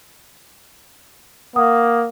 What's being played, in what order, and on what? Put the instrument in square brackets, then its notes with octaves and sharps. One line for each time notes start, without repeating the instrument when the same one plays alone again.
[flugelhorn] A#3 [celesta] F#5 D#6